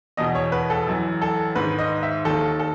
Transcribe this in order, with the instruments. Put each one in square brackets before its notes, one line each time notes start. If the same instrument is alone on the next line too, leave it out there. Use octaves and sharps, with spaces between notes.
[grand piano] E2 B2 D#5
C#5
B4
A4
F#2 E3
A4
G#2 D#3 B4
D#5
E5
D#2 D#3 A4
A4